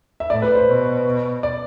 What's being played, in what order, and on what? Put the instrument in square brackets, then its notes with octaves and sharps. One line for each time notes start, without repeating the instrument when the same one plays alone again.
[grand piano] E5
[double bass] A2 [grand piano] D5
[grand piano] B4
C5
[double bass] B2
[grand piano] D5